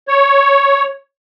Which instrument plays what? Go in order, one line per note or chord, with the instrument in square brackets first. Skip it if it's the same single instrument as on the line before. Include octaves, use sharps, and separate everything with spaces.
[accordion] C#5